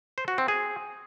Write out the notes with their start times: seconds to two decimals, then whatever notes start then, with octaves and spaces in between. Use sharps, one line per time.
0.18 C5
0.28 F#4
0.38 C4
0.48 G#4